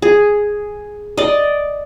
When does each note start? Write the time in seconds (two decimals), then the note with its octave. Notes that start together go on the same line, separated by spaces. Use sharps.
0.02 G#4
1.17 D5 D#5